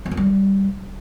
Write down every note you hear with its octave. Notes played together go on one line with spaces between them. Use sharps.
B3
D#3
G3